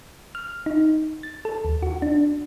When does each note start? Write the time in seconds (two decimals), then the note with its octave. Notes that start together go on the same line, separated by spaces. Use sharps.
0.35 F6
0.66 D#4
1.23 A6
1.45 A4
1.65 D#2
1.83 F#4
2.02 D4